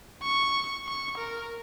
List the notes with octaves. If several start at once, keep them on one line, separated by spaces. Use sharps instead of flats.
C#6
C#6
A#4